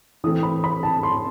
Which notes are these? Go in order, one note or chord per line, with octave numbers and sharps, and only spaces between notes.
E3 A3 C4 D#6
B5
B5
A5
C6